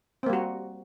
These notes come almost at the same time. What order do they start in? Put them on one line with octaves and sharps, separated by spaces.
C4 A#3 G3 F#4